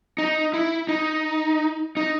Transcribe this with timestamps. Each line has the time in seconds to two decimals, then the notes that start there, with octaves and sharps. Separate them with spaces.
0.18 D#4
0.54 E4
0.89 D#4
1.97 D#4